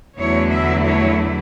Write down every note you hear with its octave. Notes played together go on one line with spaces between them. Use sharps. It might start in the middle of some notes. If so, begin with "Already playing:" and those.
E2 D3 F#3 A3 E4 C#5
E5
C#5